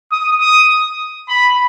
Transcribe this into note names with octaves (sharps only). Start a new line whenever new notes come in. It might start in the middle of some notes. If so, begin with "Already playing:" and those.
D#6
D#6
B5